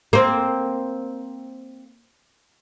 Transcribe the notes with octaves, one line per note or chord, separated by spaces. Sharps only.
A#3 C4